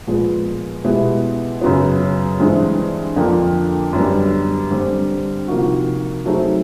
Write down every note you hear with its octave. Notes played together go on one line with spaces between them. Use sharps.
A#2 F3 G#3 B3
B2 G#3 B3 E4 G4
F#2 C#3 F#3 B3
G2 E3 G#3 C4
F2 D3 F3 A#3 D4
F#2 D3 G3 B3 D4
G2 D3 G3 C4
C3 F3 A#3 D#4 F#4
F#3 A3 C4 D#4 G#4